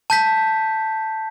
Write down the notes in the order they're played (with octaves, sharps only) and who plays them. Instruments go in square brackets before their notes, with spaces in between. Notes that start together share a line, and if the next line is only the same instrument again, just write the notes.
[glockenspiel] A5 G6 B6